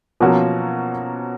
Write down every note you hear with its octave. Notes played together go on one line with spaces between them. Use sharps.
B2 F3 F#3 A#3 C#4 F#4